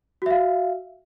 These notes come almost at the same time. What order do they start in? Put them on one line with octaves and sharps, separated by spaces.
F#4 E5 F5